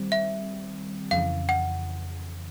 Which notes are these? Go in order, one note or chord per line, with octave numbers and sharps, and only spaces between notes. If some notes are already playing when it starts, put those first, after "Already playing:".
Already playing: D#3 G3 C4
E5
F2 C#3 E3 F5
F#5